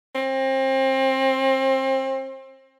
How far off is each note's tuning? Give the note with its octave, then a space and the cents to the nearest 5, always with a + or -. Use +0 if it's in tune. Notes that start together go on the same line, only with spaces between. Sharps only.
C4 +30